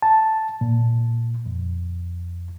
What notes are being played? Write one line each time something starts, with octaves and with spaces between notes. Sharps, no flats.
A5
A#2
F2